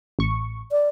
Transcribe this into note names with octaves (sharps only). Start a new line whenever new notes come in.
A1 C#6
D5